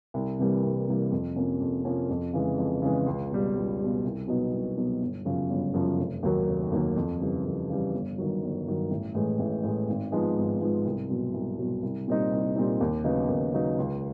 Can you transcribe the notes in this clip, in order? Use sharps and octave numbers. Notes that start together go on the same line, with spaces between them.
C2
C3 E3 G3 A#3
C2
C3 E3 G3 A#3
F2
C3 F3 A#3 C#4
F2
C3 F3 A#3 C#4
F2
C#3 E3 G#3
F2
C#3 E3 G#3
C#2
B2 G3
C#2
G3
B2
C2
B2 F#3 B3 D#4
C2
B2 F#3 B3 D#4
G1
F#2 C#3 F3
G1
F#2 C#3 F3
F1
D#2 D#3 F#3 A#3
F1
D#2 D#3 F#3 A#3
F2
C#3 E3 G3
F2
C#3 E3 G3
G1
G2 D#3 F#3
G1
G2 D#3 F#3
A1
A2 E3 G#3
A1
A2 E3 G#3
G#1
G#2 F3 G#3 B3
G#1
G#2 F3 G#3 B3
C2
B2 F#3
C2
B2 F#3
C2
A#2 G3 C4 D#4
C2
A#2 G3 C4 D#4
D#2
C#3 F#3 B3 D#4
D#2
C#3 F#3 B3 D#4
C#2